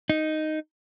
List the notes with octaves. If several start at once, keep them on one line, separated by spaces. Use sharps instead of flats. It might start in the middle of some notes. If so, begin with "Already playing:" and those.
D#4